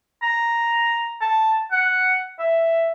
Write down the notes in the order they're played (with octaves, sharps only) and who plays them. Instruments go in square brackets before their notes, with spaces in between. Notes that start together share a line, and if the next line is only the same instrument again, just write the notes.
[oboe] A#5
A5
F#5
E5